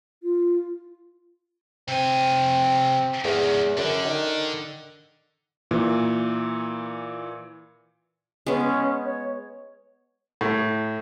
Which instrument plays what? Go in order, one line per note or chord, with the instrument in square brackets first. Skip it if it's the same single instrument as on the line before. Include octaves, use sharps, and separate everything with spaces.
[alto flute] F4
[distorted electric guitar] C3 G#5 [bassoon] C4
[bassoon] E2 [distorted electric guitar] G#2 C#4
[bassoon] F#2 [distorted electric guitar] D3
[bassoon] D#3
[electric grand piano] A#2 E3
[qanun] G#3 B3 [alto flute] C#4
[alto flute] C#5
[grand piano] A2